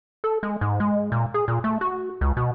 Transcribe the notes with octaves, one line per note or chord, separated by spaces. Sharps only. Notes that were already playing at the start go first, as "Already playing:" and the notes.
A4
G#3
G#2
G#3
A#2
G#4
A#2
A3
F#4
C#2
B2